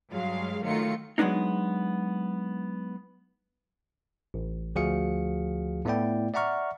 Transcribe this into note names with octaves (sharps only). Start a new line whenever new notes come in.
G2 F#3 G#3 F5
D#3 F#3 A3 F4 C#7
F#3 G#3 A3 B3 D4 D#4
A1
D2 F3 F#4 G#4 F5 C#7
A2 A3 B3 E4 D5 G5
D5 E5 F#5 A#5 C#6 F6